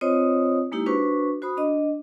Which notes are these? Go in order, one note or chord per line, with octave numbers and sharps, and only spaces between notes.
C4 F4 C5 C#5 D#5 D#6
G#3 A#3 D#4 E4 G4
D4 F#4 B4 C5 C#6
F#4 C5 B5 D#6
D4 D#5